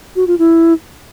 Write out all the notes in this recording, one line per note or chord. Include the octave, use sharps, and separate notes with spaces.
F#4
F4
E4